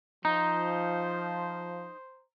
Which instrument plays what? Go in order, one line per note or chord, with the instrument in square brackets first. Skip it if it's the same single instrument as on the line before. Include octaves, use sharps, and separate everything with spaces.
[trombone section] F3 [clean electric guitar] D#4 [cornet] C5 [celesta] A#5